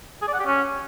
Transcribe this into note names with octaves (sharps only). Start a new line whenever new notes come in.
G#4
D5
F#5
G4
C#4